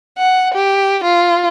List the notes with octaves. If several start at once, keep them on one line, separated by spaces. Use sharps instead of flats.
F#5
G4
F4